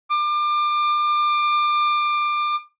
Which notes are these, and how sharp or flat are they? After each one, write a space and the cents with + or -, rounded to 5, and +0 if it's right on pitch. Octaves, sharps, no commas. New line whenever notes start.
D6 +30